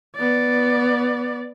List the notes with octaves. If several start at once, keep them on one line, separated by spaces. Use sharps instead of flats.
B3 D5